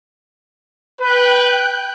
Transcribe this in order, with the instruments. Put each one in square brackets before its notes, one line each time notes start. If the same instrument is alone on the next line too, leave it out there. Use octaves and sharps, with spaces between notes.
[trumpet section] B4 [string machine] G5 F#6 G6